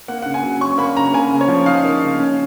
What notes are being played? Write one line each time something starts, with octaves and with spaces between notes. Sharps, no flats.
A#3 F#5
C#3 F#5
G#5
F#3
C#4 C#6
A#3 B5
C#3 A#5
A#3 G#5
C#3
C#5
F3
D#4 F5
A#3
C#3
C#4